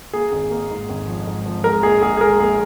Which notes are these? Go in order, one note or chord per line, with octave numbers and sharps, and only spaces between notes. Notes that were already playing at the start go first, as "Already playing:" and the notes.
A#3 G#4
G#1
A#3
G#2
G#1
F3
G#2
F3
G#3 A#4
A#1 G#4
A#1 G#4
G#4
G#3 A#4
A#1 G#4